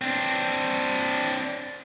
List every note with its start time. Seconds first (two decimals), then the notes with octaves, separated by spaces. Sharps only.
0.01 C4 D4